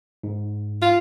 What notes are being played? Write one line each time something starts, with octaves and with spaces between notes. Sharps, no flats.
G#2
F4